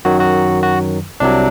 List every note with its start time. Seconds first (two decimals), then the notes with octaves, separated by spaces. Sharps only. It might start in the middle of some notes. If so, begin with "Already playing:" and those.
0.05 F#2 D#3 F#3 F#4
0.20 F#4
0.63 F#4
1.20 C2 C3 F#3 D4